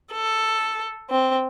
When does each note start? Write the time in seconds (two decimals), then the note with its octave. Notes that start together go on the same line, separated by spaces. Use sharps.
0.12 A4
1.10 C4